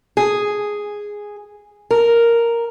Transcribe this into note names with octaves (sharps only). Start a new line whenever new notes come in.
G#4
A#4